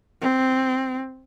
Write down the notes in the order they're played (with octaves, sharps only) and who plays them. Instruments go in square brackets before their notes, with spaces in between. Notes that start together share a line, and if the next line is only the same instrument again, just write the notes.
[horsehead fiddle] C4